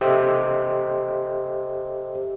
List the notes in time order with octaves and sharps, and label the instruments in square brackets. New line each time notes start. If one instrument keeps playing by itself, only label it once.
[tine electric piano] G4 A4 C5 D#5 E5